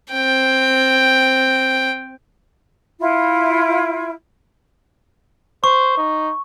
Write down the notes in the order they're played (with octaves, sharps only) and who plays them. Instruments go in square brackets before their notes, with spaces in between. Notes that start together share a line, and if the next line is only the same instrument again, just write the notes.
[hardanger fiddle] C4 G5
[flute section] E4 F4
[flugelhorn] C5 [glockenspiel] C#6
[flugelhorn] D#4